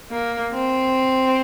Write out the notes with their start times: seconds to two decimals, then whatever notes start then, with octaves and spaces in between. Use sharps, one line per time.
0.11 A#3
0.53 C4